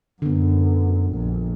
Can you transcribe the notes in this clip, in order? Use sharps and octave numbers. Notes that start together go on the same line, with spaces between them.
F#2 D3 B3
A#1